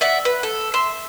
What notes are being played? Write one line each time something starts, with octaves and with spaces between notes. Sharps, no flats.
D5 E5 F#5
B4
A4
E5 C6